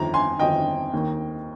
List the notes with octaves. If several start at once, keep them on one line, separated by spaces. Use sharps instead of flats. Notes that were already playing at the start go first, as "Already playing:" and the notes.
Already playing: G1 F2 D#3 A#5
G#5 C6
G1 F2 D#3 D#5 G5
D#2 D#3 A#3